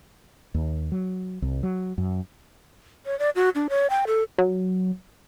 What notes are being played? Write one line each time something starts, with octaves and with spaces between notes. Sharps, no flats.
D#2
F#3
C2
F#3
F#2
C#5
D5
F#4
D4
C#5
G5
A4
F#3